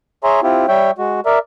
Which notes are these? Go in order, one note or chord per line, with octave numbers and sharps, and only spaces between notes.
G#4 C#5 E5 G#5 A#5 C6
C4 E4 F4 G4
G3 C#5 E5 G5
G#3 F#4
A#4 D5 E5